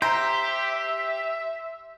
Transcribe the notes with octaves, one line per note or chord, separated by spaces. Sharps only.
G4 C5 E5 A#5